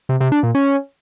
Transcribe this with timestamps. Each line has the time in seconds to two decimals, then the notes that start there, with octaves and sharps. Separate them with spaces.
0.09 C3
0.20 C3
0.32 D4
0.43 A#2
0.55 C#4